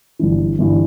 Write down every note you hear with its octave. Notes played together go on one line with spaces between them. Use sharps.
G1 G2 E3
G1 G2 E3